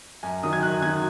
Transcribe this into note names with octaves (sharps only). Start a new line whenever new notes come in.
F#2 G#5
D#3 F#3 D#6
G#6
F#2 F#6
D#3 F#3 G#6